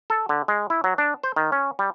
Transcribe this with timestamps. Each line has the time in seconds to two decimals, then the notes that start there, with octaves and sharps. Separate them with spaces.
0.10 A4
0.29 D3
0.48 G#3
0.70 E4
0.84 F#3
0.98 D4
1.23 C5
1.36 D#3
1.52 C#4
1.79 G3